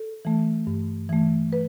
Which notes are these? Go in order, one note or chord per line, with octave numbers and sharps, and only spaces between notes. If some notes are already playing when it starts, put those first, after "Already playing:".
Already playing: A4
E3 A3
G2
E3 A3
B4